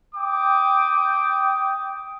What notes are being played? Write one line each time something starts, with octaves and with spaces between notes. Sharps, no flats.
G5 D6 D#6